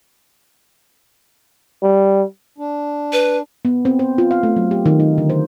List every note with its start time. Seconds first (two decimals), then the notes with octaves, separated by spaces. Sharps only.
1.82 G3
2.58 D4
3.13 B4
3.65 B3
3.85 C4
3.99 C5
4.18 F4
4.31 F5
4.43 A3
4.56 F#3
4.71 G4
4.86 D#3
5.00 D#4
5.18 D3
5.30 C5